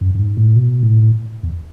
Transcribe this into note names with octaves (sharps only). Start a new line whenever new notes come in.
F#2
F#2
G#2
A2
B2
A2
E2